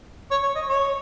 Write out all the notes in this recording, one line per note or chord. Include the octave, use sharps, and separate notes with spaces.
C#5
C#5
D#5
C#5